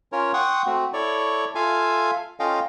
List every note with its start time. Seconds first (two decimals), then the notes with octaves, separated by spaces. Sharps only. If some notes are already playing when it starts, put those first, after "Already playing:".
0.12 C#4 F4 A#4 C#5
0.34 F#5 G5 C6 C#6 D#6
0.66 A3 C4 F#4
0.93 E4 A4 C#5 D5 C#6
1.55 F4 A4 E5 F5 G#5
2.40 C#4 F4 A4 D#5 F5 G5